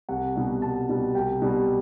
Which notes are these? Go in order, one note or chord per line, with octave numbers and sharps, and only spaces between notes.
C2 F#5
B2 G3
C2 A5
B2 G3
C2 G5
B2 G3